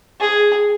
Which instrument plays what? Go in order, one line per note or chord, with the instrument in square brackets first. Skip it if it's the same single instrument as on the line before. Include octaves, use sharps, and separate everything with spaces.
[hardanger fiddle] G#4